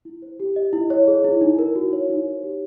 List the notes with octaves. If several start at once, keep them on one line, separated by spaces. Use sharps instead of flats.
E4
C5
G4
D#5
E4
C#5
G#4
E4
D#4
A#4
F#4
C#5
D#4
C5
G4